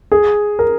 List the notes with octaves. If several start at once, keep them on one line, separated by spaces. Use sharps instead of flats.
G#4
A#4